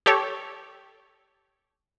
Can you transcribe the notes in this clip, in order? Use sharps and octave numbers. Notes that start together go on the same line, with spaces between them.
G4 A4 C#5